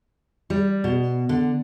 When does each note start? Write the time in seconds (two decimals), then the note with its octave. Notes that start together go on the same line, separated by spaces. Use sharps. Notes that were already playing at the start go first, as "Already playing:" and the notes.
0.50 G3
0.84 B2
1.29 D3